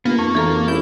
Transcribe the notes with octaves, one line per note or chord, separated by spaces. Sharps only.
G1 A#3 B3
F1 F2 C#6
G#1 E3 A4 A#5
A1 E4 G6